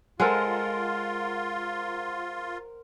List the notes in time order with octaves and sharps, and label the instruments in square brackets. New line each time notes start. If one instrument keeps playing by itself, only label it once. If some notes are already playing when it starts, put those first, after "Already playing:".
[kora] G#3 A4 [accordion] F4 [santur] A#4 C5 F#5